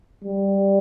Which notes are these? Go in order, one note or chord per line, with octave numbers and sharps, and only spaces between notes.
G3